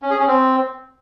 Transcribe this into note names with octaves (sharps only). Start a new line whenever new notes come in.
C#4
G#4
C#4
C4